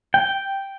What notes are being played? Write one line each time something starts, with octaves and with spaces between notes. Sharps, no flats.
G5